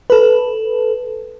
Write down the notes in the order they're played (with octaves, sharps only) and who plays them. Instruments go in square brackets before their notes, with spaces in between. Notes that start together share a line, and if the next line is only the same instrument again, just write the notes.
[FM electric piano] A4 B4